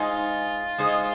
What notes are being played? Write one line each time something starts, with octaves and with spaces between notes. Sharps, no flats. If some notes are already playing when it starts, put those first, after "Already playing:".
Already playing: G#3 D#4 F4 G#4 C5
G#3 D#4 G#4 C5